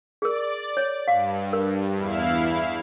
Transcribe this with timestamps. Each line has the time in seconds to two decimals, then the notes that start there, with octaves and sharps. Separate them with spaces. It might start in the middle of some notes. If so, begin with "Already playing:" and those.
0.22 G#4 A#4 D5
0.77 C#5
1.08 G2 F5
1.53 A#4
1.96 E2 E4 F5